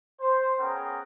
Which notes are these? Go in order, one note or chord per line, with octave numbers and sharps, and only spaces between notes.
C5
B3 C#4 G#4 A#4 G5 A#5